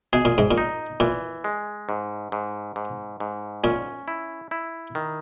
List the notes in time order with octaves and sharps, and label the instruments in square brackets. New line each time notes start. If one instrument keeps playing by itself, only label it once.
[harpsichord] B2 [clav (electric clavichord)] G#4
[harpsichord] A#2
G#2
A#2
[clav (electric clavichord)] D#4
[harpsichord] A#2 [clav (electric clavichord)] E3
[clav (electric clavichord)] G#3
G#2
G#2
G#2
G#2
[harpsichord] A#2 [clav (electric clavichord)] C#4
[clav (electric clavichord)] E4
E4
D#3